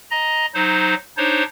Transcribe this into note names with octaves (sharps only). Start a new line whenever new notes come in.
D#5 A#5
F#3 D#4 C5
D4 D#4 C5 C#5